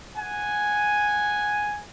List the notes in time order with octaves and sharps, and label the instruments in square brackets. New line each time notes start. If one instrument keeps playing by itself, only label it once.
[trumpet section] F#5 G#5